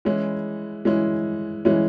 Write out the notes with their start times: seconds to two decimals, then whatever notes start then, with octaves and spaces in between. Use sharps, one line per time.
0.05 E3 G#3 C#4 E4
0.85 E3 G#3 C#4 E4
1.65 E3 G#3 C#4 E4